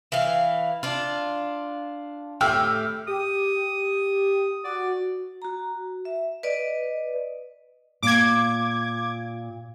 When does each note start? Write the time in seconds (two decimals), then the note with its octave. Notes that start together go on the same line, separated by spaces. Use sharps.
0.12 E3 F5
0.83 D4 F4
2.41 A2 G4 G5 E6 F6
3.08 G4 D#6
4.64 F#4 D5
5.42 F#4 A#5
6.05 E5
6.43 B4 D5 D#5
8.03 A#2 D6 G#6